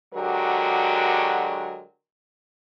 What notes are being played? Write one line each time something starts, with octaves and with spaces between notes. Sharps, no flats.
D3 F#3 G#3 F#4 G4 A#4